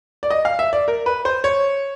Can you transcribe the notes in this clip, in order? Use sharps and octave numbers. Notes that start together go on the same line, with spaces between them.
D5
D#5
F5
E5
D5
A#4
B4
C5
C#5